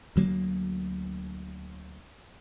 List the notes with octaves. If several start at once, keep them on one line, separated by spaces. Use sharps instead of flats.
D2 F#3 A#3